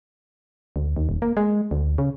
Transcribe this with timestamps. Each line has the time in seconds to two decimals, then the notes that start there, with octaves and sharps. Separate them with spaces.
0.76 D2
0.96 D#2
1.09 D#1
1.22 A#3
1.37 G#3
1.71 D2
1.98 C#3